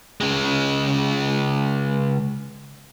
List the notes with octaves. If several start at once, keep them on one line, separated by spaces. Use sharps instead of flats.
C#3 G#3